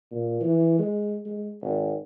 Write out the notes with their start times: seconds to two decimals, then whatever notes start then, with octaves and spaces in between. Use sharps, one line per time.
0.12 A#2
0.41 E3
0.79 G#3
1.26 G#3
1.62 G#1